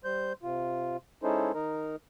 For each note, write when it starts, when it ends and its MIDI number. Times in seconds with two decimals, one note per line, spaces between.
0.04 0.33 55
0.04 0.33 72
0.04 0.33 91
0.43 0.97 48
0.43 0.97 65
1.23 1.52 56
1.23 1.52 61
1.23 1.52 63
1.23 1.52 64
1.23 1.52 69
1.23 1.52 72
1.54 1.96 51
1.54 1.96 63
1.54 1.96 70